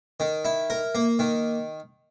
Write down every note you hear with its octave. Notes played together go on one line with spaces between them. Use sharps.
D#3
E4
A#4
A#3
D#3